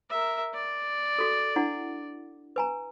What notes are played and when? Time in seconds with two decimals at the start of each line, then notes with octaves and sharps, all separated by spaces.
0.10 A#4 E5
0.54 D5
1.19 F#4 A4
1.56 D4 E4 F#5
2.56 B4 G#5 A#5